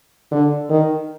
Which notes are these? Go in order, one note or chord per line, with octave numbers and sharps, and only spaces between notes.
D3
D#3